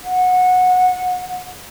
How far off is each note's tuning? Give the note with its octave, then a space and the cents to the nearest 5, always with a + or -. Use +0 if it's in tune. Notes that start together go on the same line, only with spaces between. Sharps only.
F#5 -20